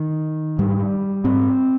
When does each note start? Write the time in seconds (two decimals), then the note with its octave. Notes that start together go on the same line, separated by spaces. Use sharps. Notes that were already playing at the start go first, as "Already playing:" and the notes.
Already playing: D#3
0.59 G#2 G3
1.24 G#2 C4